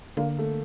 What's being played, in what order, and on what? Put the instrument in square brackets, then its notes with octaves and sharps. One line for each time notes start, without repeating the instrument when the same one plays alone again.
[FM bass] D3 [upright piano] A#3
[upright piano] A3